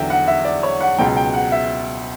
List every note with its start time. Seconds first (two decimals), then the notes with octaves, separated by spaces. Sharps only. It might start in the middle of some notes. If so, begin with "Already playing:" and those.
Already playing: E2 D3 F#3 E5 G5
0.10 F#5
0.28 E5
0.45 D5
0.63 C#5
0.81 F#5
0.98 C#2 B2 F#3 G5
1.17 G5
1.33 F#5
1.52 E5